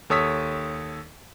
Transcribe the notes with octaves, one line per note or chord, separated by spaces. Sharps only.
D#2 A4 C#5 D#6 E6 B6